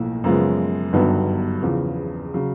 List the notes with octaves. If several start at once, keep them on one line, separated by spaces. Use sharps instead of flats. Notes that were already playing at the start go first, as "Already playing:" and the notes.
Already playing: B1 A2 F3 A#3
F#2 C#3 F3 G#3 B3
G1 G2 D#3 F#3 B3
E2 C#3 F3
C#3 F#3